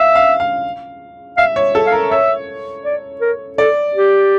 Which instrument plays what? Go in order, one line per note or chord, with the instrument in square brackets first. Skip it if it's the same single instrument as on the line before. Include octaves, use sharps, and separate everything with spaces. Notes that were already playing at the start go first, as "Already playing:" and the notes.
Already playing: [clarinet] E5 [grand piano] F5
[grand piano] F5
F5
[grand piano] E5 [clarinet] F5
[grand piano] C#5
A4
[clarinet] F5
[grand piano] A#4
[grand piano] C#5 [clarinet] E5
[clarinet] D5
A#4
[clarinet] A4 [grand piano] D5
[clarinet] G4